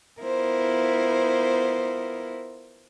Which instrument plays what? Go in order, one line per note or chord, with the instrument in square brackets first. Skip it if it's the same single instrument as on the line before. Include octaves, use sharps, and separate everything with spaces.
[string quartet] B3 E4 F4 A#4 C5